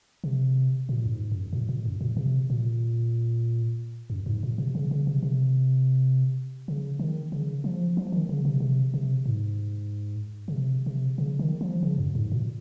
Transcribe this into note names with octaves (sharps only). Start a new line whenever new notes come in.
C3
A#2
F#2
G#2
F#2
A#2
A#2
F#2
A#2
C3
A#2
F#2
G#2
A#2
C3
C#3
C#3
C3
C3
C#3
D#3
C#3
F3
F3
D#3
C#3
C3
C3
C3
G#2
C#3
C3
C3
C#3
D#3
F3
C#3
F#2
G#2
A#2